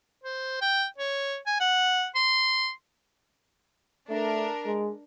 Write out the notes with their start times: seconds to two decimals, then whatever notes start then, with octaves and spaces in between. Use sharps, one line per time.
0.24 C5
0.61 G5
0.98 C#5
1.47 G#5
1.60 F#5
2.15 C6
4.10 A3 D4 A#4
4.66 G#3